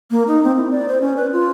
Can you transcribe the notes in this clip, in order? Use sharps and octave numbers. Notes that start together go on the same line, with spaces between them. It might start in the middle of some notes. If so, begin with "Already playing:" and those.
A#3
D#4
C4
E4
D5
C5
C#4
B4
F4